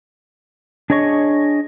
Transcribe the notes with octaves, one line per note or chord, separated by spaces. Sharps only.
D4 G#4 C#5 D#5 C#6